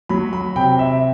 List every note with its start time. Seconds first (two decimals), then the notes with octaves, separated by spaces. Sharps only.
0.09 F#3 B5
0.33 B5
0.56 C3 G5
0.79 E5